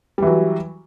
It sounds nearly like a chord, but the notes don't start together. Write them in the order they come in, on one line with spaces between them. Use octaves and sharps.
G3 E3 F#3